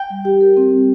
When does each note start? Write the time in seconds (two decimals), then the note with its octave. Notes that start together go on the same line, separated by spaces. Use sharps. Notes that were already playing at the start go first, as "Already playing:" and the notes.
Already playing: G5
0.10 G3
0.25 G4
0.41 A#4
0.57 C4
0.72 G3